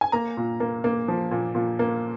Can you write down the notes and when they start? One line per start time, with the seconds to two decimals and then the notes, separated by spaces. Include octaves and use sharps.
0.01 G#5
0.12 A#3 A#5
0.37 A#2
0.60 A#3
0.84 A#3
1.08 F3
1.31 A#2
1.55 A#2
1.79 A#3